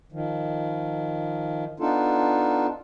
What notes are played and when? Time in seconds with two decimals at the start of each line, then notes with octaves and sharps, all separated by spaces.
0.12 D#3 F3
1.80 B3 D4 D#4 F4 A4